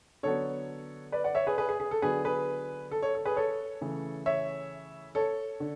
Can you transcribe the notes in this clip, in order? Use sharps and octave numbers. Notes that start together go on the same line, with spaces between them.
D3 F#3 B3 A4 C#5
B4 D5
D5 F#5
C#5 E5
G#4 B4
G#4 B4
G#4
G#4
A4
D3 F#3 B3 G#4 B4
G#4 B4
A4
A4 C#5
A4
G#4 B4
A4 C#5
C#3 E3 A3
C#5 E5
A4 C#5
D3